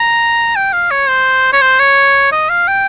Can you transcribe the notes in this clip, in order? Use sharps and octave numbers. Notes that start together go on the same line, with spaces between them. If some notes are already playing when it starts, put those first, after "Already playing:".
Already playing: A#5
G5
F5
C#5
C5
C#5
C5
C#5
D#5
F5
G5